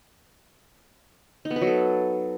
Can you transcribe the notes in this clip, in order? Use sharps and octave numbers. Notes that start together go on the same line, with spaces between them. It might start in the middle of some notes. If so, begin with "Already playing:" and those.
D#4
B3
B4
F#3
A4